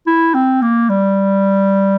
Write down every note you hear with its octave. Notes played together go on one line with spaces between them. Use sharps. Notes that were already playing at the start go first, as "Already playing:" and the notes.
E4
C4
A#3
G3